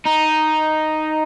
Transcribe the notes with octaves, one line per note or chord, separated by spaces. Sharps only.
D#4